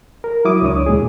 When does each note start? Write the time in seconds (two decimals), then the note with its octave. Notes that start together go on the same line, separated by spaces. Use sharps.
0.24 A#4
0.45 F#3 E4 D6 D#6
0.62 C#2 D4 C#5 D#6
0.86 D#2 A#2 G#3 G#4